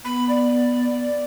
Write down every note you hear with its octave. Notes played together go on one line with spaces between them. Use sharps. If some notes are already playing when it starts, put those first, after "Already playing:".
B3 B5
D5